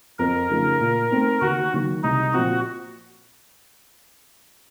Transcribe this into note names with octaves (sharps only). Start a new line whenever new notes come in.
F2 A#4
C#3 F3 A3 D#4
A#2
A3 C4 D#4
D#2 F#4
D#3 F#3 A#3
C2 D#4
A#2 F3 C4 F#4